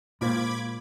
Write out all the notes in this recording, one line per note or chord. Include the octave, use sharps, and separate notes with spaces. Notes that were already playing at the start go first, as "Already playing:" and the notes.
A#2 G#3 A#3 F4 C5 B5 D6 G#6